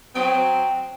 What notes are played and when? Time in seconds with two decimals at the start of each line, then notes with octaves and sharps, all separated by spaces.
0.15 F#3 C4 G5 C6 D#6